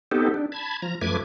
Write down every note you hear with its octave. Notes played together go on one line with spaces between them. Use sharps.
B3 C4 D#4 G4 A4
D4
A5 B5 G#6
F3 A#5
F#2 F3 A3 B4 D6 G#6